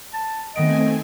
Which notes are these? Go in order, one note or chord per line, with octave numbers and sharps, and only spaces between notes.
A5
D#3 A3 B3 C4 D#5 G#5 D7